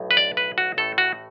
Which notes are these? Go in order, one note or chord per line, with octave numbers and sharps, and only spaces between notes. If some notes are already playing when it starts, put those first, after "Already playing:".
Already playing: B1 A2
B4
D5
B4
F#4
A1 A2 A3 A4
F#4